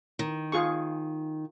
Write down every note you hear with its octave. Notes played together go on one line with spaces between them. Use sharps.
D#3
F4 G#4 C#6